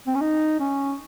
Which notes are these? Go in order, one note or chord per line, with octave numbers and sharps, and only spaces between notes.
C4
C#4
D#4
C#4